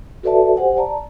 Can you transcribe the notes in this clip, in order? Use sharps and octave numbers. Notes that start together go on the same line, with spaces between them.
F#4 A4 B4 D5 E5 A5
G4 C5 F#5 G#5
D5 A5 A#5